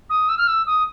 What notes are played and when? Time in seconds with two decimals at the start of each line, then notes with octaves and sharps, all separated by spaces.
0.10 D#6
0.29 E6
0.38 F6
0.48 E6
0.67 D#6